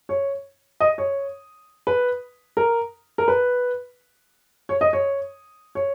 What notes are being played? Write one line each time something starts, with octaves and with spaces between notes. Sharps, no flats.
C#5
D#5
C#5
B4
A#4
A#4
B4
C#5
D#5
C#5
C#5